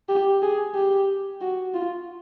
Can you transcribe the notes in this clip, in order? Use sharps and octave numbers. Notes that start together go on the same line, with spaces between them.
G4
G#4
G4
F#4
F4